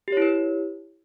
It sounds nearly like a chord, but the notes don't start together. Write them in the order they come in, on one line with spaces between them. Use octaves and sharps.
G4 C#5 E4 B4